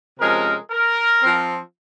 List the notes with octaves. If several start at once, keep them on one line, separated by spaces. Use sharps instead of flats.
C3 F3 G#3 C#4 A#4
A#4
F3 C4